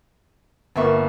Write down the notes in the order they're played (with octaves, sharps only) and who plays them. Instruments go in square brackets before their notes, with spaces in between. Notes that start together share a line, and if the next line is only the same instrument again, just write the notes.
[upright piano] G1 A#3 B3 [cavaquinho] A4 E5 C#6